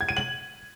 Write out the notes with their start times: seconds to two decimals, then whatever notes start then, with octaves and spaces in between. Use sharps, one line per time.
0.01 G#6
0.09 D#7
0.17 F#7